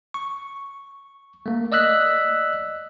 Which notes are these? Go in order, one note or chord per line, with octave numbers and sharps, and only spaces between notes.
C#6
A3 A#3
D5 D#5 E6 F#6 B6